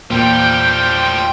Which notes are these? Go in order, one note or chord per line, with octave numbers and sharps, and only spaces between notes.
E2 A#2 F3 G3 G5 C6 G6